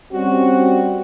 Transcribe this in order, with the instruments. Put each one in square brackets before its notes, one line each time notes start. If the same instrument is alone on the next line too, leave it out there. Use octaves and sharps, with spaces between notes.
[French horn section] G3 C4 C#4 F#4